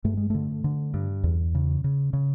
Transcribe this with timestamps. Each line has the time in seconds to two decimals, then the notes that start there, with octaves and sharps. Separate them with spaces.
0.04 G2 A3
0.17 G#3
0.30 D3 A3
0.64 D3
0.94 G2
1.24 E2
1.55 C#3
1.84 C#3
2.13 C#3